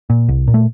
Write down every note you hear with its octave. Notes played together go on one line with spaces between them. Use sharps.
A#2
C2
A#2
A3